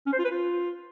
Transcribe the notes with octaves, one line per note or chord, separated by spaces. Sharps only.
C#4
C5
F4
B4
F4